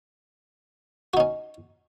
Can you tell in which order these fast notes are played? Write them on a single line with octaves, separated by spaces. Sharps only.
F#4 D#4 C#4